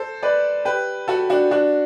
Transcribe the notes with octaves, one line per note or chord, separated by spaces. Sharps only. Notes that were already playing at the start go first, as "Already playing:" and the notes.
Already playing: A4 C5
B4 D5
G4 B4
F#4 A4
D4 F#4
D4 F#4